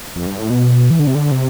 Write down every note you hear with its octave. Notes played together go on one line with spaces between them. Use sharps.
F2
G2
A2
B2
E3
D3
C3
D3
C3